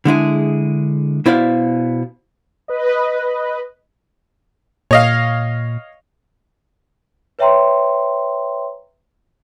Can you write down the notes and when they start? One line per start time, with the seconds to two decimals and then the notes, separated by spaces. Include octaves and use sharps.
0.05 D3 G#3 E4 G#4
1.26 B2 E4 C5 D5 F5
2.68 B4 D#5
4.91 A#2 C#5 D#5 F5
7.39 B4 C#5 E5 G5 A#5 C6